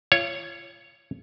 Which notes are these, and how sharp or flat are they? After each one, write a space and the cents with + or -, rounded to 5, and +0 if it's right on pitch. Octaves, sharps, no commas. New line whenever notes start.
F4 -35 C#5 +0